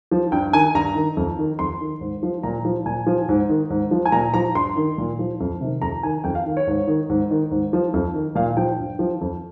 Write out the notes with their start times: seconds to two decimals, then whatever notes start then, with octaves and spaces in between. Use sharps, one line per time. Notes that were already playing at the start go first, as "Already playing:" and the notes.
0.11 F3
0.32 G2 G5
0.53 D#3 G#5
0.75 G2 A#5
0.95 D#3
1.17 F2
1.39 D#3
1.59 F2 C6
1.80 D#3
2.01 G#2
2.23 F3
2.43 A#2 A#5
2.65 F3
2.85 A#2 G#5
3.07 F3
3.29 G#2
3.49 D#3
3.70 G#2
3.91 F3
4.05 G#5
4.12 A#2 A#5
4.34 F3 A#5
4.55 G2 C6
4.76 D#3
4.98 A#2
5.19 F3
5.40 F2
5.61 C3 D#3
5.82 F2 A#5
6.03 D#3 G#5
6.24 F2 G5
6.35 F5
6.46 D#3
6.57 C#5
6.67 G#2
6.87 D#3
7.10 G#2
7.31 D#3
7.51 G#2
7.73 F3
7.94 F2
8.14 D#3
8.35 A#2 F5
8.57 F3 G5
8.79 G2
8.99 F3
9.21 F2